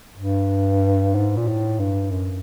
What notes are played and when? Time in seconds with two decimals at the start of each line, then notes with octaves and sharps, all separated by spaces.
0.17 G2
1.15 G#2
1.37 A#2
1.47 A2
1.79 G2
2.10 F#2